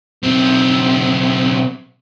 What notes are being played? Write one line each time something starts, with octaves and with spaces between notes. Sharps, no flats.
B1 C4